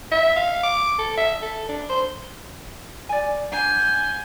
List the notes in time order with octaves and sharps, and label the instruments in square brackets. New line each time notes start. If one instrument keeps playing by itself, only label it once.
[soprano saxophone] E5
F5
D6
A4
E5
A4
D4
C5
[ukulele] D5 G#5
[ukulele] D4 F#5 A#5 [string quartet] G#5 G6